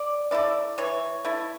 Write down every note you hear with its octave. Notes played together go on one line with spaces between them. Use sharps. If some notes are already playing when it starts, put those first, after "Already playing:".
Already playing: D5
A3 E4 D5
E3 C#5
A3 E4